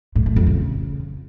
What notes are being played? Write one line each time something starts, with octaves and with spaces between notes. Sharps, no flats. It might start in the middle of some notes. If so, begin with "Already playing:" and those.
A2
A2
F2
C#3